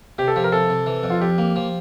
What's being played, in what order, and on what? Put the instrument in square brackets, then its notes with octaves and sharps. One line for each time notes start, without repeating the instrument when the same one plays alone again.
[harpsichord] C3 [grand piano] G4
[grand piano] A4
[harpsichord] F3 [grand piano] G4
[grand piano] A#4
[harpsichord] C3 [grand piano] A4
[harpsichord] C3
E3
F2
[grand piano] F4
[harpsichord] F2 [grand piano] G4
[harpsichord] A#3
F3